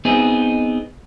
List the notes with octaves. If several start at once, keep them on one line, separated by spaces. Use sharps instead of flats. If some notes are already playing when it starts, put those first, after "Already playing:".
B3 C4 D#4 G#4